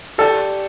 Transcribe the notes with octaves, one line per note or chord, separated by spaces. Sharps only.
G4 A4 D5 G5